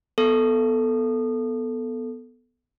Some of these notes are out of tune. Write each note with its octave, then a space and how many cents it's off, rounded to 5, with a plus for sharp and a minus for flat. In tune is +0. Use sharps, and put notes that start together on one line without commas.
B3 +0 A4 +0